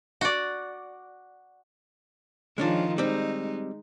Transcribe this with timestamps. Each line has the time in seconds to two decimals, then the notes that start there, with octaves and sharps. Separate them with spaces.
0.21 F#4 D5
2.58 D#3 F3 G#3 C#4 D4 F4
2.98 G3 G#3 C4 D#4